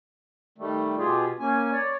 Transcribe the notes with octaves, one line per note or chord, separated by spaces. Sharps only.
D#3 G3 A3
B2 F4 G4 G#4
A#3 C#4 G#5
C#5 D5